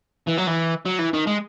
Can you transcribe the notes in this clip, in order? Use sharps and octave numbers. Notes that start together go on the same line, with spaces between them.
E3
F#3
E3
F#3
E3
D#3
G#3